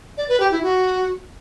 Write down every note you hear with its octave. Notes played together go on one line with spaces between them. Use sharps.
D5
B4
G4
E4
F#4